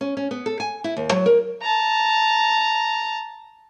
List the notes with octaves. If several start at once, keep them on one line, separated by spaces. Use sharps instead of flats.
C#4
C#4
B3
A4
G#5
E4
D#2
F#3
A#4
A5 A#5